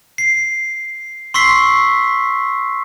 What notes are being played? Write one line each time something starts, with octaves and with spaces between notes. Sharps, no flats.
C7
C6 C#6 E6 B6 C7